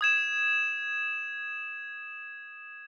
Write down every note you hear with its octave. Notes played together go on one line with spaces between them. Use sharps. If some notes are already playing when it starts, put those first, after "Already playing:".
D#6 G#6 E7